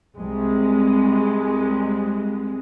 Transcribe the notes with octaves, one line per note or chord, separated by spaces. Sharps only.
C2 G#3